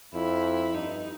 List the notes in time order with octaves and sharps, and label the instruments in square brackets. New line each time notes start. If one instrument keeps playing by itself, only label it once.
[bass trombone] F2 [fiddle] E4
[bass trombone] G2 [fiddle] D#4